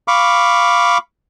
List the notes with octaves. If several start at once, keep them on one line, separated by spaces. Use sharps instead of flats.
F5 B5 C#6 D6